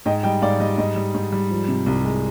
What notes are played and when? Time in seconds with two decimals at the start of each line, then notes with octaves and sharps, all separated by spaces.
0.06 G#2 D#5 G5
0.23 G3 D#5 G5
0.42 G#2 D5 F5
0.60 G3 D#5
0.78 G#2 D#5
0.96 G3
1.14 G#2
1.32 G3
1.51 F3
1.68 C3
1.86 C2
2.05 G#3